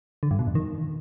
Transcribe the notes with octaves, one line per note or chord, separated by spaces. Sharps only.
D3
G2
B2
F2
D#3